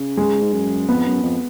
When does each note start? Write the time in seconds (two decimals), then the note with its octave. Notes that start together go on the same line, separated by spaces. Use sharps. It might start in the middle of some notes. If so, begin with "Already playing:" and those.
Already playing: C#3
0.17 G#3
0.41 G#2
0.53 F#2
0.88 F2 B3
1.05 F#2
1.23 F2